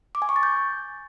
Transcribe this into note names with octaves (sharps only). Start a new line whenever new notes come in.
D6
G#5
C#6
A6
G6